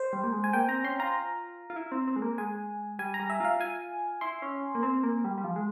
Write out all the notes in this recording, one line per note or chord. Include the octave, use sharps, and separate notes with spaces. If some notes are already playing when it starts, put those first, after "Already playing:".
Already playing: C5
G3
A#3
G#3
G#5
A#3 G5
C4 A#5
C#4 C6
F4 A#5
F4
E4
C4
C4
G#3
A#3
G#3 G#5
G3 G#5
A#5
G3
E5
F4 F5
F4 G#5
E4 C6
C#4
A#3
C4
A#3
G3
G3
F3
G#3